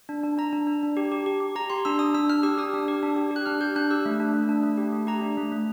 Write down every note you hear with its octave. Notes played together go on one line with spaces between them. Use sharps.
D4
D4
D4 A#5
D4
D4
D4
G4
G4
G4
G4
G4 A#5
G4 C6
D4 E6
D4 D#6
D4 E6
D4 F6
G4 E6
G4 D#6
D4
G4
D4
G4
G4
F#6
D4 F6
G4 G6
D4 F#6
G4 E6
A3
D4
A3
D4
A3
G4
A3
G4 A#5
D4
A3
A3